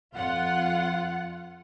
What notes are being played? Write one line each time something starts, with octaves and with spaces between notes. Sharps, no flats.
F2 F4 F#5